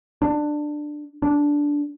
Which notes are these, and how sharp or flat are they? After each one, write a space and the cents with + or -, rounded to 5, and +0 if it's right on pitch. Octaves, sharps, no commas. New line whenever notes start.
D4 +15
D4 -10